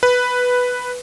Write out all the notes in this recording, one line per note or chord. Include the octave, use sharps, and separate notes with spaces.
B4